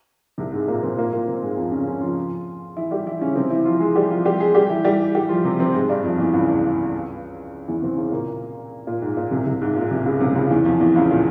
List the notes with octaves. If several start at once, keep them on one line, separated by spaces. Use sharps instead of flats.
C2 C3
G#2 G#3
A#2 A#3
C3 C4
A#2 A#3
A#2 A#3
C3 C4
G#2 G#3
F2 F3
C#3 C#4
C#3 C#4
F3 F4
E3 E4
G3 G4
E3 E4
C#3 C#4
C3 C4
E3 E4
F3 F4
G#3 G#4
G3 G4
F3 F4
G3 G4
G#3 G#4
G3 G4
E3 E4
G3 G4
G3 G4
F3 F4
C3 C4
C3 C4
G#2 G#3
G2 G3
F2 F3
E2 E3
C#2 C#3
E2 E3
C3 C4
C#3 C#4
A#2 A#3
A#2
G#2
A#2
C2 C3
C2 C3
G#2
A#2
C2 C3
C#2 C#3
C2 C3
C3
C#2 C#3
E2 E3
F2 F3
E2 E3
C#2 C#3
A#2